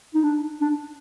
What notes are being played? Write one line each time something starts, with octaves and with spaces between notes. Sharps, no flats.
D#4
D4
D4